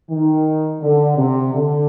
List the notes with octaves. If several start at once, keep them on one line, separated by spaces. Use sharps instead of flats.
D#3
D3
C3
D3